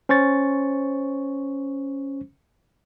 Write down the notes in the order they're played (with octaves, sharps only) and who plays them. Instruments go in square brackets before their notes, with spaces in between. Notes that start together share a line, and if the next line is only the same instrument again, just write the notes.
[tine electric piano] C#4 C5 C#6 A6